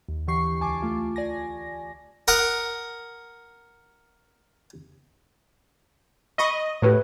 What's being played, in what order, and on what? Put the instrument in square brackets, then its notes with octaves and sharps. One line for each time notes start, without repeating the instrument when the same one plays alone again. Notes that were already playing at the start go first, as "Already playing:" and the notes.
[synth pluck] D#2
D3 E3 G4 C#6 C7
C#2 G#5 A5 D6
A3 F4
D5 G#5 A#6
[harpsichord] A#4 F#5 D#6
[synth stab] D#5 [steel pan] B5 C#6 D#6
[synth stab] A2 [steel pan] G4 B4 C#5